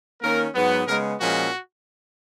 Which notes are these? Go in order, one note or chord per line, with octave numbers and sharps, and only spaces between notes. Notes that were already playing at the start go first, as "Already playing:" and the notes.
D#3 A#3 C#4 A#4
G#2 F#3 B3
C#3 G#3 B3 A#4
A#2 F3 G#3 C#4 F#4